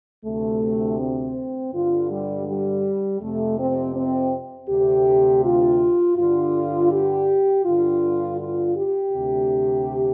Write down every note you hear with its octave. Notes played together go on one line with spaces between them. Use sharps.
D2 C3 A3
C4
G2 D3 F4
G3
G3
F2 C3 A3
C4
C4
D2 C3 G4
F4
G2 D3 F4
G4
G2 D3 F4
F4
G4
D2 C3